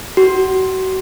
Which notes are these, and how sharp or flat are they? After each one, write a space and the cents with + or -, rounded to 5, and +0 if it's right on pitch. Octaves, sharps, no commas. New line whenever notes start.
F#4 +30